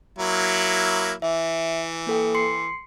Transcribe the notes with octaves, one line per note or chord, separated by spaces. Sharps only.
F#3 A#3 E4
E3 E5
A#3 A4 G5
C6 C7 C#7